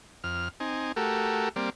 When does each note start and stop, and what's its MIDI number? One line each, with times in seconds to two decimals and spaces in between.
0.24 0.48 41
0.24 0.48 89
0.60 0.92 60
0.60 0.92 63
0.60 0.92 80
0.96 1.49 57
0.96 1.49 66
0.96 1.49 67
0.96 1.49 69
0.96 1.49 70
1.56 1.70 55
1.56 1.70 58
1.56 1.70 60
1.56 1.70 74